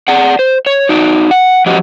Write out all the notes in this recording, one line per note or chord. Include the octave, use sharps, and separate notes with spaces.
G#4 D5 F#5
C5
C#5
D#4 F#4 D5
F#5
F3 F#3 G4 D#5 F#5